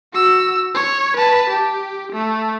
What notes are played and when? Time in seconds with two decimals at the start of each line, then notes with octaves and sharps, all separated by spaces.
0.13 F#4 E6
0.75 C#5
1.17 B4 A5
1.50 G4
2.12 A3